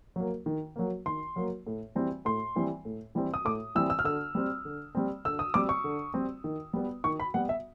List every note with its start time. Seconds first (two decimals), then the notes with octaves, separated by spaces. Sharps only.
0.16 F#3 A#3
0.46 D#3
0.76 F#3 A#3
1.06 D#3 C6
1.36 F#3 A#3
1.67 A2
1.95 E3 G3 C4
2.25 A2 C6
2.56 E3 G3 C4
2.85 A2
3.15 E3 G3 C4
3.34 D#6
3.45 A2 D6
3.75 E3 G3 C4 E6
3.90 E6
3.99 F6
4.04 D3 E6
4.35 G3 C4
4.65 D3
4.95 G3 C4
5.25 D3 E6
5.39 D#6
5.54 G3 C4 D6
5.69 C#6
5.84 D3
6.14 G3 C4
6.44 D#3
6.73 G3 B3
7.04 D#3 C#6
7.20 B5
7.34 G3 B3 F#5
7.49 E5